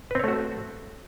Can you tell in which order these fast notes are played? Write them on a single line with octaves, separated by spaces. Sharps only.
B4 C4 C#5 A3 F#4